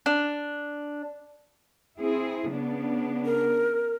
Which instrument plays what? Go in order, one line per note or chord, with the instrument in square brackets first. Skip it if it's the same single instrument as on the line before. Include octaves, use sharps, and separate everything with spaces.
[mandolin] D4
[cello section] C4 E4 G#4
C#3 B3 D4
[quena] A#4